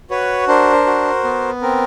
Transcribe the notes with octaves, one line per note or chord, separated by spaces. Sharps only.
F#4 B4 C#5
D4 A#4 C5
F#4
B3
C4 A#4